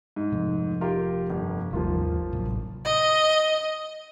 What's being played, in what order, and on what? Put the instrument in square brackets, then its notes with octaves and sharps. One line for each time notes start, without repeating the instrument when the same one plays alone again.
[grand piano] G#2
[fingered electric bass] C3 F3
[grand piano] F4 G4 A#4
G1
[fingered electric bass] G#1 D#2 G3 [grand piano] F3 A#3 F4
[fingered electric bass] A1 C3 F#3
[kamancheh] D#5